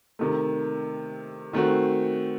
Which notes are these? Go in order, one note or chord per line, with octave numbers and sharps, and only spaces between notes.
C3 D#3 A3
D#3 A3 C4 F#4